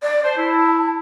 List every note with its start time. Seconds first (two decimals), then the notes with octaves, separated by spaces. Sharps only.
0.02 D5
0.24 C5 A5
0.37 E4